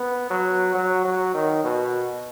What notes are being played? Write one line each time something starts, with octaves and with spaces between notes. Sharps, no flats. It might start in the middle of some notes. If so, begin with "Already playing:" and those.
Already playing: B3
F#3
F#3
F#3
D#3
B2